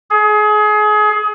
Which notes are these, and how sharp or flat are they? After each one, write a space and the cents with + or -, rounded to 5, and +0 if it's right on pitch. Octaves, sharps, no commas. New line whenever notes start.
G#4 +30